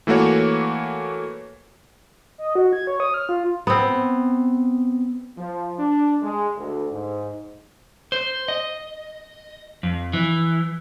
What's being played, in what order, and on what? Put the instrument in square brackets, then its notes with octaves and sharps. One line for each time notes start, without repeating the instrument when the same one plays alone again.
[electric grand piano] E3 A3 A#3 F#4 C#5
[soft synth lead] D#5
F#4
G#6
C#5
D#6
F6
F4
[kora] B3 C4
[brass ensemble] F3
D4
G#3
D2
G#2
[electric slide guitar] C5
D#5
F2
E3